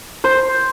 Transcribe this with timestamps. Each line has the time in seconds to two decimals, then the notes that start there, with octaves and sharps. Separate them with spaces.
0.24 C5